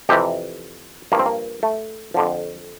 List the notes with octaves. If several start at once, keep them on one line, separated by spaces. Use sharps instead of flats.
F2 C3 E3 G4
G2 F3 A#3
C4
A#3
A3
F2 D3 F3